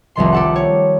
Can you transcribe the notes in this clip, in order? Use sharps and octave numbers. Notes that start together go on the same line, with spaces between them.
F1 C2 D#3 C6
G4 A4 F#5
C#5